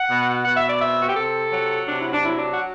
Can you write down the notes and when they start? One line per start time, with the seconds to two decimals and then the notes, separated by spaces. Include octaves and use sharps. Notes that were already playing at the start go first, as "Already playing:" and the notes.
Already playing: F#5
0.08 B2
0.45 B2 F#5
0.57 E5
0.69 D5
0.80 C4 E5
1.02 F#4
1.09 G4
1.16 C3 A4
1.53 F#3
1.88 C3 D4
2.01 E4
2.13 D4
2.25 F#3 E4
2.37 D4
2.54 F#4